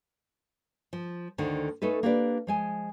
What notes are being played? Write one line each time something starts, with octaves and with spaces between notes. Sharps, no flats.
F3
D2 D3 D#3 C5
A3 C#4 D#4 A4 B4
A#3 D4 E4 G4 B4 D5
F3 G#3 G#5